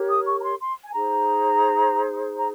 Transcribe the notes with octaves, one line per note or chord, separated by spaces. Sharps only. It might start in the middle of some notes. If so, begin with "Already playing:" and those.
Already playing: G4 A#4 C#5
D#6
C#6
A#5
C6
C6
G#5
D#4 G#4 C5 A#5
A#5